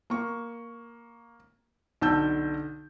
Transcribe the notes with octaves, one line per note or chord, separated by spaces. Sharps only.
A#3 C#6
B1 D3 A5 E6 G6